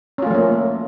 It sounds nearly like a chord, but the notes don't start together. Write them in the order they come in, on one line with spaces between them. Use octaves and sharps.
C#4 F4 A3 F3 A#3